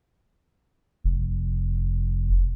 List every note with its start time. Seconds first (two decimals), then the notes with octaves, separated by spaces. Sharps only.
1.04 F1